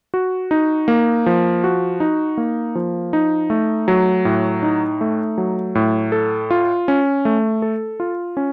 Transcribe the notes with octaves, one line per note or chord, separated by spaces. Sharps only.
F#4
D#4
A#3
F3
F#4
D#4
A#3
F3
D#4
A3
F#3
A2
D#4
A3
F#3
A2
A4
F4
C#4
A3
A4
F4
C#4